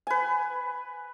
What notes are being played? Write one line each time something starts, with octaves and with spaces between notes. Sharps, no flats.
B4 G#5